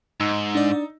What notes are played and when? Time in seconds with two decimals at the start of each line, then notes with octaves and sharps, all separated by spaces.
0.20 G#2 D#4 E6
0.55 D4 D5